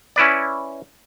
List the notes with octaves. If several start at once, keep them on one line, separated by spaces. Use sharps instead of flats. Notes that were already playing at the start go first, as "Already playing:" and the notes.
C#4 E4 B4 D5